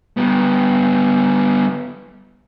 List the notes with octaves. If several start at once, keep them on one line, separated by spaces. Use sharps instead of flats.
G3 B3